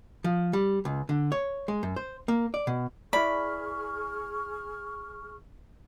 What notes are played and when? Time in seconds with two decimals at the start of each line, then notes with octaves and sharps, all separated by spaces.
0.24 F3
0.53 G3
0.85 C#2
1.09 D3
1.32 C#5
1.68 G#3
1.83 F#2
1.96 C5
2.28 A#3
2.54 D5
2.67 B2
3.13 E4 G#4 B4 D5 B5 C#6 F6